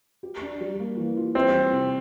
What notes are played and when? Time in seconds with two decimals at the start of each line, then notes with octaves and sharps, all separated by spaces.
0.23 G4
0.41 D4
0.61 G3
0.79 A#3
0.97 E3
1.17 F4
1.35 G3 C4
1.53 E3
1.73 C3